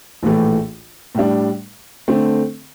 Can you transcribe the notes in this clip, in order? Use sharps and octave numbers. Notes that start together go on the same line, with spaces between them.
A#1 A2 E3 A3
A2 G3 D4
D3 A3 C4